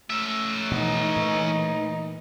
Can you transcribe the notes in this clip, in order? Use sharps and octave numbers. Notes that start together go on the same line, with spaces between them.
A3 C#4 E5
B2 E3 F3 B3 D#4
A#2